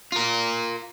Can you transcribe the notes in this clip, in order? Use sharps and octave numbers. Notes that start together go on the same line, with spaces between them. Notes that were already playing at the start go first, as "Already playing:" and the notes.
F4 A#4